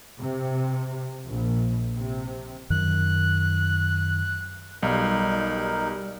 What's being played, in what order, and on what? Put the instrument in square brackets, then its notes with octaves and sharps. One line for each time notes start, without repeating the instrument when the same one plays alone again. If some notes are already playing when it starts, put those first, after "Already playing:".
[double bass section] C3
A#1
C3
[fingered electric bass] F#2 D#3 [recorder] F#6
[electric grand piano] B1 [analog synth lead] G3 [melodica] D#4 A#4